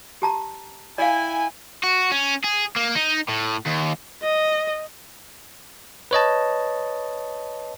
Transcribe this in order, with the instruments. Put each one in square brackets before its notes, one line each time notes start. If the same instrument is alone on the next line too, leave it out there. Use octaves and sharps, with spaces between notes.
[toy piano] G4 A5 A#5
[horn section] E4 G5 G#5 [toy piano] D5 F5
[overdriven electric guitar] F#4
C#4
G#4
A#3
D#4
A2
D#2
[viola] D#5
[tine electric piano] B4 C#5 D#5 A5